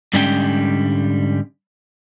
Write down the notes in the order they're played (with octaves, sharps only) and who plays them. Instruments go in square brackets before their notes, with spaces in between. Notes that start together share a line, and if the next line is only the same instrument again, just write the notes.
[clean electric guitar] G#2 D3 G3 G#3 C#4 G5